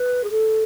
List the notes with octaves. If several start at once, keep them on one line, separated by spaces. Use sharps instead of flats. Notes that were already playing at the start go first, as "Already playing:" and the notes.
Already playing: B4
G#4
A4